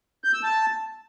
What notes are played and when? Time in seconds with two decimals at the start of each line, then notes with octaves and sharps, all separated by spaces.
0.24 G6
0.34 E6
0.43 A5